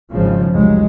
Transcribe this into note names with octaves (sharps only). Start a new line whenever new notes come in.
G#1 C#3 F3
F1 C#2 F#3 G#3